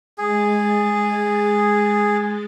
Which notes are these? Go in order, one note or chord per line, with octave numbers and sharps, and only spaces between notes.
G#3 G#4 A6